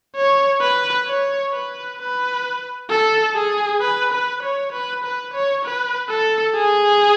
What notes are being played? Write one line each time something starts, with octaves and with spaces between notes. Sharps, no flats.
C#5
B4
C#5
B4
B4
A4
G#4
B4
B4
C#5
B4
B4
C#5
B4
A4
G#4